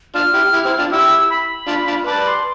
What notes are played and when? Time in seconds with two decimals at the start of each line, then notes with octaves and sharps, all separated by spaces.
0.15 D4 F4 F6
0.34 E4 G4
0.53 E4 G4
0.65 C4 E4
0.79 D4 F4
0.91 E4 G4 E6
1.30 B5
1.68 D4 F4
1.87 D4 F4
2.06 B4 D5 A5
2.26 C6